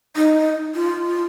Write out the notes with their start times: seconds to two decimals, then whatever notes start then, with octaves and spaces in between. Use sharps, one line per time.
0.16 D#4
0.75 F4